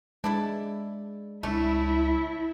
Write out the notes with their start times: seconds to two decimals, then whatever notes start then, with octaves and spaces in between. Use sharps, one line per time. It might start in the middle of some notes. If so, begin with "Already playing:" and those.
0.24 G#3 D4 E4 A4
1.43 C#2 A3 C#4 D4 E4